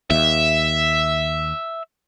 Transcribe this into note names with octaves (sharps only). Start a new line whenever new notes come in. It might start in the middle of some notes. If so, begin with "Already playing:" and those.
D#2 E5